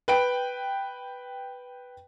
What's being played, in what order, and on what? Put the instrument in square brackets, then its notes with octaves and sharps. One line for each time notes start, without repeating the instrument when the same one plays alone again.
[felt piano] B4 G5 D7